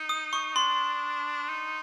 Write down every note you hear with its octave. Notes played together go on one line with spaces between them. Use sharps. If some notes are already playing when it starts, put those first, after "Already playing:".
Already playing: D#4
D#6
C#6
D4 C6
D#4